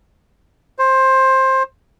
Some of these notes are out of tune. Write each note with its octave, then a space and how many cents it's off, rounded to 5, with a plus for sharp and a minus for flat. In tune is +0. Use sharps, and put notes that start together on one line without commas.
C5 +15